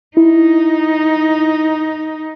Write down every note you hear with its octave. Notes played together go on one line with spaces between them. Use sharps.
D#4 E4